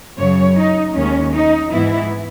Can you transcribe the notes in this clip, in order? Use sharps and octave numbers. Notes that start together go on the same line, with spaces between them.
F#2 C#3 F#3 C#5
D#4
D#2 D#3 G#3 C#4
D#4
G#2 E3 B3 E4